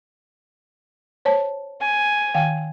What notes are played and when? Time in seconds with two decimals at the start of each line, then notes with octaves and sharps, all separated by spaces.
1.25 C5 C#5 A5
1.81 G#5
2.34 D#3 F5 G5